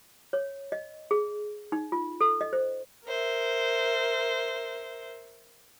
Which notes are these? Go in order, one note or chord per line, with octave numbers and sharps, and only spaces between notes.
C#5
D#5
G#4
D#4
F4
A4
D#5
C5
A#4 C5 E5